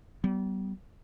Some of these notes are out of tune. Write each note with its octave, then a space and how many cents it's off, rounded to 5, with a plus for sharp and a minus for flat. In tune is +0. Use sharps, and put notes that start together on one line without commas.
G3 -35 B3 +0